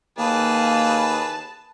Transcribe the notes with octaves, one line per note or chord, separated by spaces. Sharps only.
D#2 A#3 G#4 B4 A5